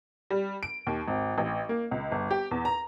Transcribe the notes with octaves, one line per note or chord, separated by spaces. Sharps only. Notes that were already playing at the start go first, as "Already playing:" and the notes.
G3
D7
D#2
G#1
A1
A#3
C#2
G1
G4
E2
A#5